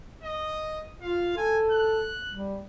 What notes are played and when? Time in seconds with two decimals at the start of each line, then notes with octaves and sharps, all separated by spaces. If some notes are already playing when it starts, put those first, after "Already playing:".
0.23 D#5
1.02 F4 F5
1.37 A4 G#5
1.71 F#6
2.34 G3